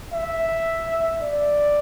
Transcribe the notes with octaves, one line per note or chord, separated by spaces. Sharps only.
E5
D5